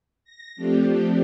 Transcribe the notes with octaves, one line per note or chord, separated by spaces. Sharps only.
A#6
F3 A3 C4 D4 G4